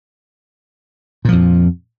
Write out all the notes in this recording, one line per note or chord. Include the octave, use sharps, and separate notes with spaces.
F2 A#2 F3